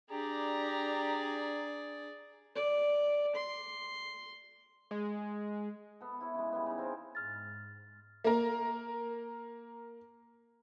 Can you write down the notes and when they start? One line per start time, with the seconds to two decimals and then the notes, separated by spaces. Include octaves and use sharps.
0.11 D4 G4 G#4 D5 A#5
2.55 D5
3.35 C6
4.91 G#3
6.01 B3 A4
6.21 E4 C#5
6.35 C#3 G#3
6.52 G3 B3
6.66 C#3 D#4
6.78 C4 G#4 A#4 C5
7.15 G#2 F6 A6
8.24 A#3 A#4